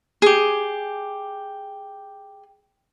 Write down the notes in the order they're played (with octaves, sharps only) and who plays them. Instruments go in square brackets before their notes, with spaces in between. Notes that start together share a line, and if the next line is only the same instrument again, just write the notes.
[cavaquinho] G4 G#4